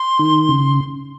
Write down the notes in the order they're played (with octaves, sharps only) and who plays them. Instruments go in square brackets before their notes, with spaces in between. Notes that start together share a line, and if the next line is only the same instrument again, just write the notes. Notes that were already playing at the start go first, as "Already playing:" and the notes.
Already playing: [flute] C6
[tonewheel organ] D#3
C#3